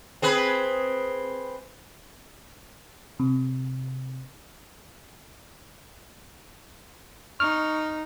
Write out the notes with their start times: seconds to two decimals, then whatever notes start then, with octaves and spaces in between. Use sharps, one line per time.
0.22 C4 G#4 B4
3.20 C3
7.40 D#4 C#6 F6